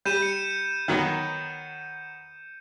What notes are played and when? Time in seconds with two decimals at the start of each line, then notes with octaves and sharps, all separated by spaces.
0.05 G3 G6 D#7 E7
0.22 C#7
0.88 D#3 F#3 B3